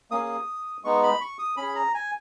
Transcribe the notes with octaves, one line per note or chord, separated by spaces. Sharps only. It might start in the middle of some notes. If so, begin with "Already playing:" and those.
A#3 C#4 G#4 D#6
G#3 B3 D#4 C#6
B5
C#6
D#6
C#4 G#4 B5
A#5
G#5